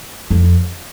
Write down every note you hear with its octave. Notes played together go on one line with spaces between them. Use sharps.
F2